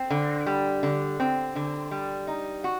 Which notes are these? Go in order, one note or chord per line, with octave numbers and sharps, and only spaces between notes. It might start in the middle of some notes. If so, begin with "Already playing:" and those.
Already playing: C4
D3
G3
D3
C4
D3
G3
D#4
F#4